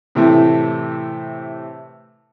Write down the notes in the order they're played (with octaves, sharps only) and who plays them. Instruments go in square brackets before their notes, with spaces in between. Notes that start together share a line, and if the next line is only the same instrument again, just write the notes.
[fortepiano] A2 C3 E3 A3